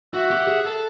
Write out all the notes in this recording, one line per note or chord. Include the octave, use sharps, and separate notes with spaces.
F#4 E5 F#5
G4
G#4
A4